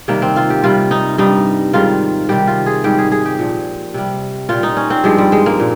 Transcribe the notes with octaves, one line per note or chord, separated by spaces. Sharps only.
C3 D#3 G3 A#3
C4
F4
G4
C3 G3 F4
D#4
G2 G3 D#4
G#2 D#3 G3 F4
C3 D#3 G3 G4
F4
G#4
G#2 G3 G4
G#4
G#4
G4
A#2 F3
C3 G3
A#2 G3 F4
D#4
C#4
C4
G2 F3 G#3
G3
G#3
A#3
A#2